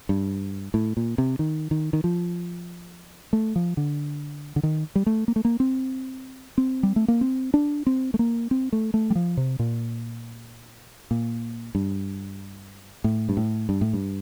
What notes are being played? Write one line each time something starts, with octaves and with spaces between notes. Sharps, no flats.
G2
A2
A#2
C3
D#3
D#3
D#3
F3
A3
F3
D3
D3
D#3
G3
A3
A#3
A3
A#3
C4
C4
G3
A3
A#3
C4
D4
C4
A3
A#3
C4
A3
A3
G3
F3
C3
A#2
A#2
G2
A2
G2
A2
G2
A2
G2